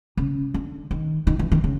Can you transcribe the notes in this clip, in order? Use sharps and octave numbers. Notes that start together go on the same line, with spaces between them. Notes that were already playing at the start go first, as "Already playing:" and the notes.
C#3
D3
D#3
D#3
E3
D#3
C#3